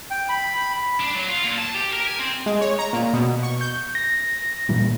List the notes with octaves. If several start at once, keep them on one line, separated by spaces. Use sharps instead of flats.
G5
B5
D4
F#3
F4
A#2
A5
G4
A#4
G#5
C4
G#3
C#5
A#5
A#2
B2
C#6
G6
A#6
A#2 E3 G3